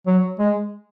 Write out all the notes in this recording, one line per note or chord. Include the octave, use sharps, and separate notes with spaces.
F#3
G#3